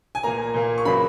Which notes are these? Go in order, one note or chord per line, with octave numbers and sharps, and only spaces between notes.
G#5
A#2 A#3 A#5
A#2 A#3
C#6
C#3 F#3 A#3 B5